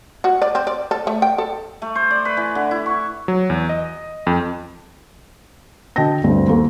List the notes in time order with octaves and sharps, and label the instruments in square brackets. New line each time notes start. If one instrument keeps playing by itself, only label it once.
[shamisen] F#4
D5
C4
D5
A4
A3
G5
A4
[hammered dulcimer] A3
C5
D5
B4
E3
D3
E4
C#6
[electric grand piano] F#3
E2
D#5
F2
[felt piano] D3 F#4 D#5 G5 A5 A#6
D2 G2 C4
D#2 A4